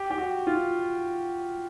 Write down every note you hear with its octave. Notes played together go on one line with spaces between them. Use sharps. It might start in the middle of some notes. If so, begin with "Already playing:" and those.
Already playing: G4
G4
F#4
F4